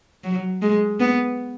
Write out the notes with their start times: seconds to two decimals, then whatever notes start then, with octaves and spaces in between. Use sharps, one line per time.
0.24 F#3
0.62 G#3
1.00 B3